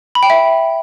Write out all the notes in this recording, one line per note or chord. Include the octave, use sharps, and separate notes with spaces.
B5
G5
E5